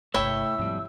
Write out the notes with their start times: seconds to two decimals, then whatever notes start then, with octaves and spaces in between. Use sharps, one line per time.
0.14 G1 C3 A3 E4 C#5 E5 G5 E6
0.59 F2 G#2 G3